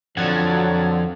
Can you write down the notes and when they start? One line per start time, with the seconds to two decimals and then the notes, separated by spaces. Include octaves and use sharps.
0.17 F2 D3 F3 F#3 C4 F#5 G#6 A6